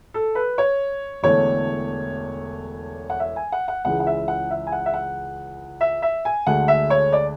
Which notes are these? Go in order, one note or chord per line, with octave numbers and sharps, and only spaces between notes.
A4
B4
C#5
E1 E2 D3 A3 C#5
F#5
E5
G#5
F#5
F#5
C#2 C#3 E3 G#3 F#5
F#5
E5
F#5
E5
G#5
F#5
E5
F#5
E5
E5
G#5
D2 D3 G#3 F#5
E5
C#5
D5